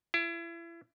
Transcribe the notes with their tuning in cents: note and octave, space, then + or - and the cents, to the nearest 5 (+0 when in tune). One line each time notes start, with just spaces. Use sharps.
E4 +35